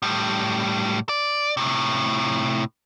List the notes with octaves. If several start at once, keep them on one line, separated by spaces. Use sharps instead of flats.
A2 G3
D5
A2 C3